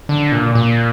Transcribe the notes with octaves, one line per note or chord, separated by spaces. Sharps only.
D3
A#2
A#2